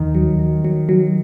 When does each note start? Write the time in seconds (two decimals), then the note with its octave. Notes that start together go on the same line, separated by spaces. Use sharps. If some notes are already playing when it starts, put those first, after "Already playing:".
Already playing: D#2 D#3
0.15 F#3
0.39 F#3
0.65 F#3
0.89 F#3